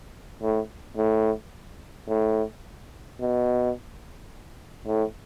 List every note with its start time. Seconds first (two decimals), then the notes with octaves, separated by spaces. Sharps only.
0.43 A2
0.97 A2
2.09 A2
3.20 B2
4.87 A2